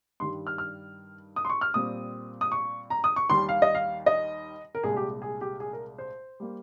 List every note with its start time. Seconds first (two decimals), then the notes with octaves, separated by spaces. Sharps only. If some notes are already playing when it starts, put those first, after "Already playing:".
0.20 G2 D#3 G3 C6
0.47 F6
0.58 F6
1.36 D#6
1.45 C6
1.50 C#6
1.61 F6
1.74 A#2 G3 C4 D#6
2.41 D#6
2.52 C#6
2.90 A#5
3.04 D#6
3.16 C#6
3.30 D#2 D#3 G3 C6
3.49 F5
3.62 D#5
3.75 F5
4.06 D#5
4.75 A#4
4.83 C2 A#2 G#3 G#4
4.97 G4
5.22 G#4
5.41 G4
5.60 G#4
5.73 A#4
5.98 C5
6.40 G3 A#3